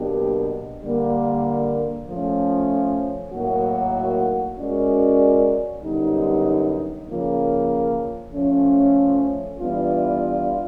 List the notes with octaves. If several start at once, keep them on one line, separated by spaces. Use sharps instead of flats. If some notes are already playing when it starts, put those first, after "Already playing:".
Already playing: B2 F#3 A#3 D4 G4
D3 G3 A#3
F3 A3 C#4
A2 F#3 A#3 D#4 F#4
G#3 C#4 F#4 A#4 D5
F#2 D3 G3 B3 D#4
C#3 F3 A#3
F3 A3 C#4
E3 G3 B3 D4 F4